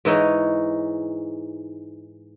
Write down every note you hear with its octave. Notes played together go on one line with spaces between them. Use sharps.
G#2 E3 D#4 C#5